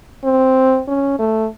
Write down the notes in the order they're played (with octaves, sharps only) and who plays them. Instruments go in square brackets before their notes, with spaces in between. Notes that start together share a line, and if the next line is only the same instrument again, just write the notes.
[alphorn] C4
C#4
A3